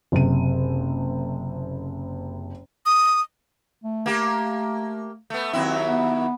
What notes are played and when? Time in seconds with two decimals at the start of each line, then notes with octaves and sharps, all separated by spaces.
0.12 F#1 C3 D#7
2.86 D#6
3.84 A3
4.06 A#3 G4
5.30 A3 B3
5.53 D#2 F#3 C4 E4
5.87 B3